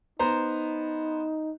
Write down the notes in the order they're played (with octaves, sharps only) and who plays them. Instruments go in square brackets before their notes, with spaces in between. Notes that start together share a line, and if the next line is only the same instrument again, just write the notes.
[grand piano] B3 C5 A#5 [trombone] D#4